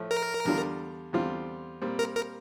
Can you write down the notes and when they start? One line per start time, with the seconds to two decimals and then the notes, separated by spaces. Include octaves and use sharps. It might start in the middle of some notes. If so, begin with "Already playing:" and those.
Already playing: A2 F3 A3
0.11 A#4
0.45 E2 D3 G3 D4 F4
1.13 E2 D3 G3 C4 F4
1.82 A#2 G3 C4
1.99 A#4
2.16 A#4